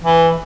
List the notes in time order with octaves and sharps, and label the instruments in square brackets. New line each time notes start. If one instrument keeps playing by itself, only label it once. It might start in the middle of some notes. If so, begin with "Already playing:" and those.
[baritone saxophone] E3